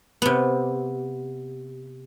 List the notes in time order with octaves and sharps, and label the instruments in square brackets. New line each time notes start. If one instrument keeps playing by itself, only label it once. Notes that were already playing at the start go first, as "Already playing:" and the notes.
[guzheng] C3 B3